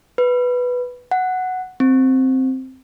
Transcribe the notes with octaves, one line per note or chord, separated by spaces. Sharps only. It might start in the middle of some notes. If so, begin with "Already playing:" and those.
B4
F#5
C4